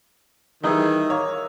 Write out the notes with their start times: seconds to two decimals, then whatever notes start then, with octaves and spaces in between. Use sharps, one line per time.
0.63 D#3 E3 G3 D#4 G#4 D#5 E5
1.10 A#3 C#5